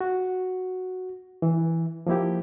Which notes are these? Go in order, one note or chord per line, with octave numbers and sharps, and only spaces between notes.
F#4
E3
F3 A#3 E4 G4